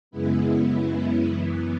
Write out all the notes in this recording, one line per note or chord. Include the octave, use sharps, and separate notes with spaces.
F#2 C#3 G#3 B3 E4
F#2 E3 B3